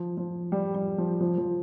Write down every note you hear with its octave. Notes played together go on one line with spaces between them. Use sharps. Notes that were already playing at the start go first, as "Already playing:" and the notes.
Already playing: F3
F3
G3
G3
F3
F3
F3